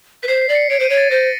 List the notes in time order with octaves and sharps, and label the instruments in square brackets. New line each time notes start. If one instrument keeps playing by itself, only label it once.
[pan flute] B4 [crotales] B6
[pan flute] C5 [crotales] C7
[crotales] C7
[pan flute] D5
[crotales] C#7
[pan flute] C#5 [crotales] D7
[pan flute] C5 [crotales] D#7
[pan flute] C#5
[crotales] A6
[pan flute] C5 [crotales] A#6